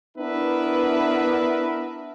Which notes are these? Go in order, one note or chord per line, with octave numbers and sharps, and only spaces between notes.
B3 D4 E4 A#4 B4 E5